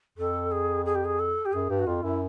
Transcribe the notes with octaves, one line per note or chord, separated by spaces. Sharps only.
F2 A4
G#4
G#4
G4
G#4
A4
G4
F#2 G#4
G2 G4
F#4
F2 F4
F#2 E4